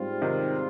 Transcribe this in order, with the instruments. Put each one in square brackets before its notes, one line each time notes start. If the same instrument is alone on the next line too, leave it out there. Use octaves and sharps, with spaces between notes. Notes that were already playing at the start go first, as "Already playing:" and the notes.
Already playing: [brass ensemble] G#2 G3 C4 F4
[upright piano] C3 D#3